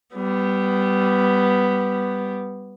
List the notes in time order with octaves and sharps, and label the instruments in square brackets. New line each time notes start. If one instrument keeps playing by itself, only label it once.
[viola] G3 B3